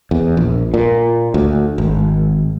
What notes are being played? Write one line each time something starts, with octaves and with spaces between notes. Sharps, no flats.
E2
A#1
A#2
D2
G#1